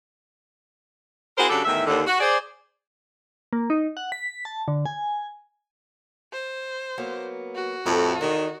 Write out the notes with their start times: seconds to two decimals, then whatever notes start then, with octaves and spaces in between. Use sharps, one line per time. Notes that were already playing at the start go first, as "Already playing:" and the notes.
1.38 C4 E4 F#4 G#4 A#4 C5
1.49 C#3 F#3 D4 F#4 G4 A4
1.64 E2 A2 D#3 E5
1.87 D#2 D3
2.06 F#4
2.20 G#4 C5 D5
3.53 A#3
3.70 D#4
3.97 F#5
4.12 B6
4.45 A5
4.68 D3
4.86 G#5
6.33 C5
6.98 F#3 A#3 B3
7.56 F#4
7.86 F2 A2 A4 E5
8.21 E2 D#3 D#4